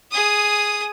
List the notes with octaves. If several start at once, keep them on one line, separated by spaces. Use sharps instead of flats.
G#4 D#6